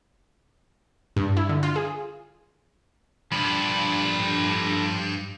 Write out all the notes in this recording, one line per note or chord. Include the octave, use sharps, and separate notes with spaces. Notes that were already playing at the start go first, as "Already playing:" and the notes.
G2
E4
D3
F4
G#4
G2 F3 D4 A4 B4